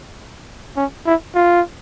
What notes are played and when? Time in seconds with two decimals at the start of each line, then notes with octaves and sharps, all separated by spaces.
0.76 C#4
1.06 E4
1.35 F4